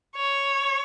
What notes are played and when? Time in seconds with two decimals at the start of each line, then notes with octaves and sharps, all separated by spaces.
0.16 C#5